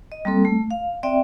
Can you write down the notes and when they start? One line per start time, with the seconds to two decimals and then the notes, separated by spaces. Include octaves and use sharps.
0.12 D#5
0.25 G3 A#3 C4 A4
0.45 A3
0.71 F5
1.03 C4 D5 E5 G5